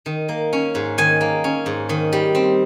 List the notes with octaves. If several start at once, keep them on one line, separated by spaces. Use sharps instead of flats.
D#3
A#3
C#4
G#2
D#3 G#5
A#3
C#4
G#2
D#3
G3
C4